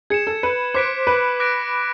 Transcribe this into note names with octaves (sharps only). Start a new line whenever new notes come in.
G#4 G#6 C#7 E7
A4
B4
C5 D6 F#6 B6 D7
B4
D6 F#6 A#6 D7